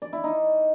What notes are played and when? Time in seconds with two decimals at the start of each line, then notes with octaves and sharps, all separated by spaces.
0.02 D5
0.13 E4
0.24 D#4